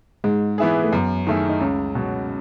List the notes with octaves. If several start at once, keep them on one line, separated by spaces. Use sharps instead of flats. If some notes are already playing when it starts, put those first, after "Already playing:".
G#2 G#3
E3 B3 E4 G#4
A3
F#2 B3
D#3 A3 E4 G#4
D#4
C#2 C#4
B2 F#3